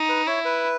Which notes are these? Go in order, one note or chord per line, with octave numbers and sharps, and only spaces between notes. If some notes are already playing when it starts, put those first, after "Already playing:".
Already playing: D#4
B4
E4 C#5
B4